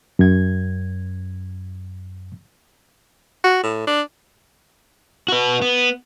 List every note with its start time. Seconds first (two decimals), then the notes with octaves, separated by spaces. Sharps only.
0.19 F#2 G#6
3.44 F#4
3.63 A2
3.87 D4
5.28 F#4 B4
5.62 B3